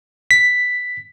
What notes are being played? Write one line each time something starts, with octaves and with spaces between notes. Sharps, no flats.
B6